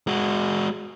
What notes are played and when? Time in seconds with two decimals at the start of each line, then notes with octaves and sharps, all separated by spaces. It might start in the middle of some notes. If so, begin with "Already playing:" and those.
0.07 G#3 F#4